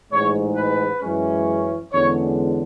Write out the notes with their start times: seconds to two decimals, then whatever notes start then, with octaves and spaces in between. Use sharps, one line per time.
0.12 A1 G#2 G#3 C#5
0.57 B4
1.02 F#2 E3 G#3 C#4
1.92 E2 D3 G#3 C#4 C#5